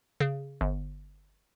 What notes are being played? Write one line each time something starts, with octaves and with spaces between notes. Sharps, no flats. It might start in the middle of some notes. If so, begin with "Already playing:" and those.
C#3
G1